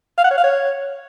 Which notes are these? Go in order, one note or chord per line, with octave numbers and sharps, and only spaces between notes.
F5
F#5
C#5
F5
C#5